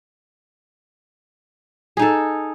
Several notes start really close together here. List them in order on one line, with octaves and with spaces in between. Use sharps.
G#4 D#4 A4